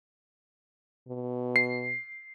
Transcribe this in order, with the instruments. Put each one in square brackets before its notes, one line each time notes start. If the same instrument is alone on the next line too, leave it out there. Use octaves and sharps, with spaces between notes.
[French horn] B2
[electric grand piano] C7